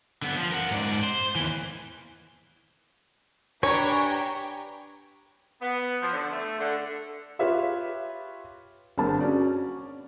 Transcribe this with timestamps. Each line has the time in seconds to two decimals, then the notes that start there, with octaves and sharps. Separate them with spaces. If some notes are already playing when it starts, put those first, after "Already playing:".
0.22 D3 B3
0.37 F3
0.52 A#4 F#5
0.71 G#2 D5
1.04 C5
1.35 D#2 E3
3.63 D4 G4 B4 C#5 G5 G#5 A#5 C#6
5.62 B3
6.01 F3
6.12 D3
6.31 A3
6.59 D3
7.39 F4 G4 B4 C#5 E5 F5
8.98 G1 D3 A#3 C4 G#4 A5
9.20 C#4 F#4 D5